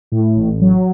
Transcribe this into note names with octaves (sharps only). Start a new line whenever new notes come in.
A2
A1
F#3